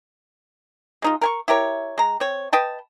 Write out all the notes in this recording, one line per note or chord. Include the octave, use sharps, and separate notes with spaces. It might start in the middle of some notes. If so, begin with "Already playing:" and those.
G#3 D#4 F4
A#4 G#5 C#6
E4 G4 A#4 C#5
G#3 A#5
C4 C#5
B4 D#5 G5 A5